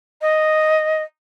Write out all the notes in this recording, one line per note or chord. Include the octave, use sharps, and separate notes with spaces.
D#5